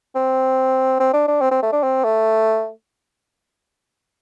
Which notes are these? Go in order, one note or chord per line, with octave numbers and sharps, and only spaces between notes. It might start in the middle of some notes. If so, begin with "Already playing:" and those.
C4
C4
D4
D4
C4
C4
A3
D4
C4
A3